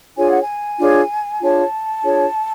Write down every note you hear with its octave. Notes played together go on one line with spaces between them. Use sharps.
D4 F4 G#4 C#5 G#5
F#5
G#5
D4 F4 G#4 C#5
D4 F4 G#4 C#5 A5
D4 F4 G#4 C#5